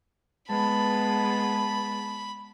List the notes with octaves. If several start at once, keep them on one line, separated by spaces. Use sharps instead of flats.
G#3 B3 A5 B5